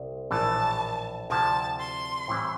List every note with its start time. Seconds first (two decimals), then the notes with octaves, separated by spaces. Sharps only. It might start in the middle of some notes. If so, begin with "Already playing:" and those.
Already playing: C2 C4
0.31 A#1 A2 E3 A5
1.30 D2 C3 F3 C4 E4 A5
1.79 C6
2.28 A2 E3 G3 C4 E4